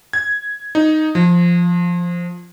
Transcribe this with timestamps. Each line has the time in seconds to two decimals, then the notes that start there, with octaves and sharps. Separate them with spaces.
0.13 G#6
0.75 D#4
1.15 F3